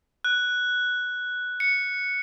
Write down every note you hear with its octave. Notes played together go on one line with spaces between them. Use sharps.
F#6
C#7